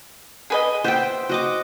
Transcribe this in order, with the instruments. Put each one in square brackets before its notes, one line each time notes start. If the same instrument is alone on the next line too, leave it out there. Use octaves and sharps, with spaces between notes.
[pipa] G#4 B4 D#5
[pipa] B3 [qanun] C5 E5 G5
[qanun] F#4 D#5 D6